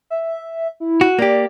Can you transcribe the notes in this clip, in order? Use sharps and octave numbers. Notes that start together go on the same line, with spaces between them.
E5
E4
F#4
A#3 G4 D5